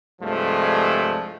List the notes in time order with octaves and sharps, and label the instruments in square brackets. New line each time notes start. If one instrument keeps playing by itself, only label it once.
[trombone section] C2 G2 F3 G#3 A3